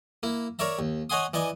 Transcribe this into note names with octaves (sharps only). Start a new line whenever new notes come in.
A#3 E4
A#4 C#5 D5 E5 A#5
D#2
C#5 D#5 F#5 G#5 C6 D#6
E3 D5 D#5 G#5